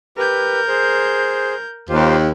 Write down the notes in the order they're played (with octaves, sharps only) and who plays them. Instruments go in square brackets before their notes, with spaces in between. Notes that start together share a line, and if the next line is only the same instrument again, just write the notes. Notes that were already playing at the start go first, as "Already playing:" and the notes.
[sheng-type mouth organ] G4 B4 [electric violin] A#4 G6
[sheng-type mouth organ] G#4 C5
[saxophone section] D#2 [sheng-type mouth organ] F4 G4 C5